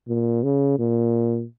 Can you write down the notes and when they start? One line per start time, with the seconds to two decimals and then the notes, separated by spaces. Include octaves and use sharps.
0.08 A#2
0.44 C#3
0.79 A#2